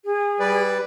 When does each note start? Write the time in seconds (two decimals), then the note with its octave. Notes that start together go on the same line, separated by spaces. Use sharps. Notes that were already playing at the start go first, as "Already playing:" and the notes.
0.04 G#4
0.40 G3 B4 D5